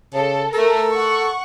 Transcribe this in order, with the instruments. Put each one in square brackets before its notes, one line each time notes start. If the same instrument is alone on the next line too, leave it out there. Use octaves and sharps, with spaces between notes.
[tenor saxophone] C#3 [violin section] A4
[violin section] A3 A#4 [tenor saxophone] A4
[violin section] F#5 C#6